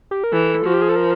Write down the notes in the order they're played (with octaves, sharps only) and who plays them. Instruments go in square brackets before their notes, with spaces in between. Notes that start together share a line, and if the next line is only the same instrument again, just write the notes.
[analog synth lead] G4
A#4
[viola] E3 [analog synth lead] A4
[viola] F3 [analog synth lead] F#4
[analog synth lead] G4
G#4
A4
A#4